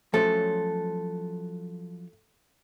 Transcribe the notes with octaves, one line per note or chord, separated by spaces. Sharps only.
F3 F#3 A3 C#4 A4